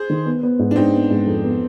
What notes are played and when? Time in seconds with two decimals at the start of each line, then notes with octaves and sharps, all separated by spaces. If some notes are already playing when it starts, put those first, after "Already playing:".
Already playing: G#4 C5
0.10 D#3
0.26 B3
0.43 B3
0.59 G#2
0.71 D4
0.76 G#2 C4 D#4
0.93 B3
1.10 G#2
1.27 F2
1.43 B3